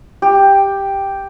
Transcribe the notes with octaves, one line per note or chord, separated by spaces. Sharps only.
G4